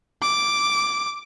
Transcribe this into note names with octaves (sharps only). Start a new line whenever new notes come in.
D6